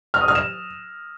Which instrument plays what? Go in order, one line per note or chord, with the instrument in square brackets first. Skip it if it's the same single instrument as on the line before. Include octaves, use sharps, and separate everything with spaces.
[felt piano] F6
D#6
F6
E7